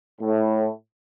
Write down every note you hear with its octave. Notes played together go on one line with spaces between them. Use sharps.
A2